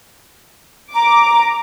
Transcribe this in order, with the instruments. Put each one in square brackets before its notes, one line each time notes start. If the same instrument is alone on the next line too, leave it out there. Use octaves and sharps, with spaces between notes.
[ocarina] A#5 [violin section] D6